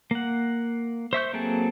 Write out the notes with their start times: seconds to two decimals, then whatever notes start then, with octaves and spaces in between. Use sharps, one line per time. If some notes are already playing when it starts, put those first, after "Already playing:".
0.11 A#3 F#5
1.13 C5 E5 C#6 G6
1.33 F#3 A#3 C4 G#4 A4